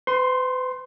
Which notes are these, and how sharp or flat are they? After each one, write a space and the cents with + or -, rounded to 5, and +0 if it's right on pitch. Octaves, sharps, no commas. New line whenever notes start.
B4 +45 C6 +10